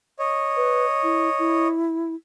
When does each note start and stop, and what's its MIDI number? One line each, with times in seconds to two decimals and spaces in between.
0.19 1.68 73
0.19 1.68 75
0.57 0.85 71
1.03 1.29 64
1.39 2.15 64